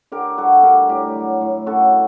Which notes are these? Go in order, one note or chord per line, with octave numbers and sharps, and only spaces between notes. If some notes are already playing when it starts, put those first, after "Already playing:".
D3 G4 A#4
G3 F#4 A4
D3 G4 A#4
A2 G4 A#4
F#3
A2
F#2 F#4 A4